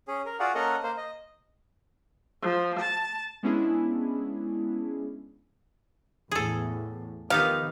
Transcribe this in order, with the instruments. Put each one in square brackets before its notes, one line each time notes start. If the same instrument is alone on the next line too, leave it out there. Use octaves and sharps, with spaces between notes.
[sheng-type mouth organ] C#4 G#4
A#4
F4 F#4 G#4 D5 F#5
A#3 C#4 A4 A#4 D#5 F#5
A#3 C5
D#5
[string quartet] F3
A5
[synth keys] G#3 B3 C#4 D4 E4 G#4
[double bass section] E2 A2 [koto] G#4 A4
[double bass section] D#3 F3 [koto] B3 D#4 G4 [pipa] F5